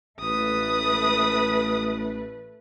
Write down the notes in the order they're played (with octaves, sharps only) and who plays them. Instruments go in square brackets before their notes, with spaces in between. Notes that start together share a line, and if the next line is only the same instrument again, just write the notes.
[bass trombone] A1 [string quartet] A3 B4 [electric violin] D#6